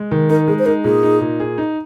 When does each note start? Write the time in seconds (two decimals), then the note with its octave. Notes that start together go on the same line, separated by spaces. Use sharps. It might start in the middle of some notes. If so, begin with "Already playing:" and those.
Already playing: G#3
0.11 D#3
0.29 D#4 A#4
0.48 G#3 G#4
0.59 C5
0.66 D#4 A#4
0.84 A#2 G#4
1.03 D#4
1.21 A#2
1.40 G#4
1.58 D#4